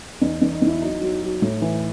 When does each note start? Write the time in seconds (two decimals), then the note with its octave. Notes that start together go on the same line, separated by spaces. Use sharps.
0.22 E2 D#4
0.42 E2
0.52 D#4
0.62 E2 E4
0.82 F#3 D#4
1.01 F#3
1.22 F#3
1.42 A2
1.62 E3